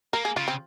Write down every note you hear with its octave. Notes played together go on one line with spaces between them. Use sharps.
A#3 A#4
G#4
C#3 F4
C4